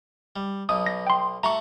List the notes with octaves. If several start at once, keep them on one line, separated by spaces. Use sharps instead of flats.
G3
B1 B2 D#6
A#6
G5 C6
A3 F#4 F#5 A#5 C#6